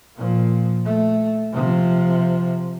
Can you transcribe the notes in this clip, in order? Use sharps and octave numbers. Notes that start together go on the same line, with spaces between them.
A#2 F3
A3
C3 F3